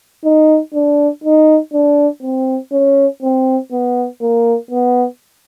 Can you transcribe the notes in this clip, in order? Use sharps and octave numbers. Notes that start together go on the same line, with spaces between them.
D#4
D4
D#4
D4
C4
C#4
C4
B3
A#3
B3